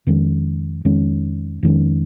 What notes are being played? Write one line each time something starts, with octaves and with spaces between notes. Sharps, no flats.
F2 D#3 G#3 C#4
F2 D#3 G#3 C#4
F2 D#3 G#3 C#4